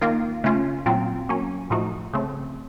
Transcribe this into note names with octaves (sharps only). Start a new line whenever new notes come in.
D#3 A#3 F4
C#3 A3 C#4 F4
A#2 F#3 C4 F4
F#3 A#3 C#4
A2 F3 A3 D#4 F#4
C#3 A3 C4